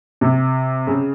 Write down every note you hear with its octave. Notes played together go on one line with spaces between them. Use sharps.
C3
C#3